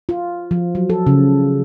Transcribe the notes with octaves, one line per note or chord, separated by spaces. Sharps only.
F4
F3
F#3
A4
C#3